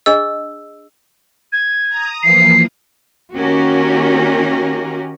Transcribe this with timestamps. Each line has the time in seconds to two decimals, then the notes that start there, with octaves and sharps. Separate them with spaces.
0.06 D4 G#4 D#5 E6
1.52 G#6
1.89 A#5 D#6
2.22 E3 F3 A#3 C7
3.35 D#3 A#3 C#4 F#4 G4 A#4